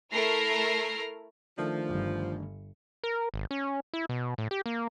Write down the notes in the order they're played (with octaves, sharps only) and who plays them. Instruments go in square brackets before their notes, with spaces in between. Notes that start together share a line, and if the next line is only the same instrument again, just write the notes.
[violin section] A3 E4 A#4 F6 A#6 C7
[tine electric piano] D#3 A3 D4 [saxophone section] F3
[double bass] G1
[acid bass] A#4
G#1
C#4
E4
B2
A2
G4
A#3